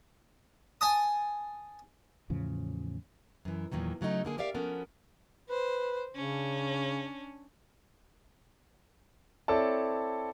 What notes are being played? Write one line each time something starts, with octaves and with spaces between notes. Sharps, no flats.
G#5 A5 D#6
E2 A2 C#3 F3
F#2 E3
E2 A#2 D#3 F#3
C#3 F#3 A3 D#4
D3 A#3 G#4
G4 A#4 D5 E5 F5
F3 B3 C#4 F#4 A4 A#4
B4 C5
C#3 C#4 D4
C4 E4 A4 C#5 D5 A5